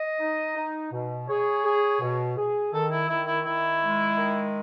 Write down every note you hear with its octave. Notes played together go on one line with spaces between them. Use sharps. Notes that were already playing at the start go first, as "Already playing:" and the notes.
Already playing: D#5
D#4
D#4
B2
G#4 C#5
G#4
B2
G#4
D#3 A4
E4
D#3 E4
E4
D#3 E4
G#3
D#3